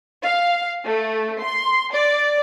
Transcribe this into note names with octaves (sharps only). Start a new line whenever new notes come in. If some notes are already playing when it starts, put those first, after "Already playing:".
F5
A3
C6
D5